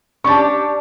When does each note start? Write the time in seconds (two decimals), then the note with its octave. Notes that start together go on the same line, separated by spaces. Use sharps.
0.24 C#4 D4 G4 A5 C#6